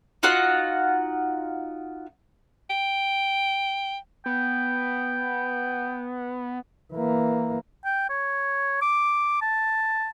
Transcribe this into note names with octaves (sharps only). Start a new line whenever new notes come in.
D#4 F4 F#4 F#5
G5
B3 G5
E3 A#3
G5
C#5
D6
A5